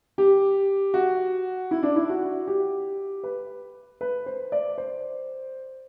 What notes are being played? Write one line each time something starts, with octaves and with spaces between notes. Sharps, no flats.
G4
F#4
E4
D4
E4
F#4
G4
B4
B4
C5
D5
C5